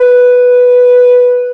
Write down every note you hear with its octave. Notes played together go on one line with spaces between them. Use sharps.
B4